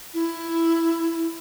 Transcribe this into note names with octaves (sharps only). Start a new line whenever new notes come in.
E4